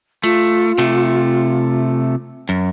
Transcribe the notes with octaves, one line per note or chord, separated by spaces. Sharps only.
A3 F4
C3 A3
F#2